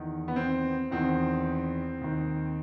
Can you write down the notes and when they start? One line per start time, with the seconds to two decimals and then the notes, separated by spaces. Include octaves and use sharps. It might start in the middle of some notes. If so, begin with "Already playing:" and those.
Already playing: E2 D#3
0.28 B3
0.36 C4
0.91 E2 D#3 C4
2.01 D#2 D#3